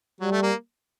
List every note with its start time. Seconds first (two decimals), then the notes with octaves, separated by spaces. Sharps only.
0.20 F#3 G3
0.32 A3
0.42 A#3